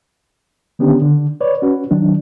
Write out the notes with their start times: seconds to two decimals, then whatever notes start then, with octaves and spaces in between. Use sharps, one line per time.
0.79 D3 D#3 B3 C#4 D4 G4
1.02 D3
1.41 B4 C#5 D5
1.62 C#4 F#4 B4
1.91 D#3 F#3 D4